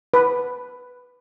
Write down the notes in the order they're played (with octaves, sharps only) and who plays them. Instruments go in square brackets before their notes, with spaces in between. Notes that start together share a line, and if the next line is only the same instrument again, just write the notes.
[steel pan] B4